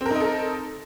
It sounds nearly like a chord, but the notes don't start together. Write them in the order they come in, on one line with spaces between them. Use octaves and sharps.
C4 A#4 D#4 D#5 A4